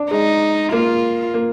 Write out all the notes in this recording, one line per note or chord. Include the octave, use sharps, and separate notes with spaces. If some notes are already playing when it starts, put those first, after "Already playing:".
Already playing: D4
G#3 D#4
A#3 F4
A#3